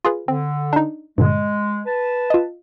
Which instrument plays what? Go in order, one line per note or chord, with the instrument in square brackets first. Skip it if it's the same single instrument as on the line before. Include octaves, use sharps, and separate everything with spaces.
[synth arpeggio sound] F4 G#4 B4
[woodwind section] D3 [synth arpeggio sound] C4
[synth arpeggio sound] D4 D#4
[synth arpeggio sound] G2 A#2 D3 [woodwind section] G#3
[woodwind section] B4 A5
[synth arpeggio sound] F4 D#5